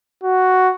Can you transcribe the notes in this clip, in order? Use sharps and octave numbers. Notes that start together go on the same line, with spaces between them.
F#4